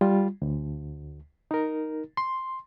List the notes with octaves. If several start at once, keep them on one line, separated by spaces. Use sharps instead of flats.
G3 F4
D2
D#4 A#4
C6